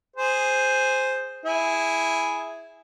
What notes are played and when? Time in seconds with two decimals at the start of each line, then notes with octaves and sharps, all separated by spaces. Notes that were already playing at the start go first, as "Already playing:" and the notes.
0.16 G#4 C5
1.45 E4 G#4